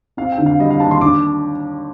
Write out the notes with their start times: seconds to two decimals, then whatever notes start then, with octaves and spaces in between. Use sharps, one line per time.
0.17 C4 F5
0.32 G5
0.38 D3
0.46 F5
0.60 G3 D#5
0.70 F5
0.80 D#2 A5
0.91 C6
1.01 D4 D6